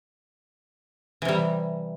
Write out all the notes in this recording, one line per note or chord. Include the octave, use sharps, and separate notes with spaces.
C3 E3 G3